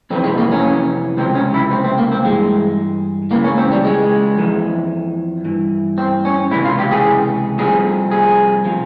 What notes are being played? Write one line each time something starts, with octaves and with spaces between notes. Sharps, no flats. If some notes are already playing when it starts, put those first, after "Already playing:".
F2 C3 E3 C4
G#3
A#3
C#4
C#2 C3 F3 C4
C#4
E4
C4
C4
A#3
C4
G2 E3 G#3
C#2 C#3 E3 A#3
C#4
C4
G3
G#3
F2 E3
G2 E3
C4
C#4
C#2 C3 E3 E4
F4
G4
G#4
C2 C3 F3 G#4
G#4
C3 F3